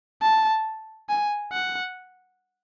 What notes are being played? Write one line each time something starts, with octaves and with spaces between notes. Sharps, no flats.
A5
G#5
F#5